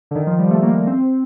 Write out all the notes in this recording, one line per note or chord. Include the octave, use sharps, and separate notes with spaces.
D3
D#3
F3
G3
A3
A#3
C4